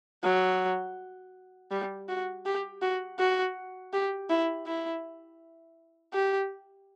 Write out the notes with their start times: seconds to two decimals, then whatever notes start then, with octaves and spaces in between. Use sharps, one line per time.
0.24 F#3
1.71 G3
2.09 F#4
2.46 G4
2.82 F#4
3.19 F#4
3.93 G4
4.30 E4
4.67 E4
6.14 G4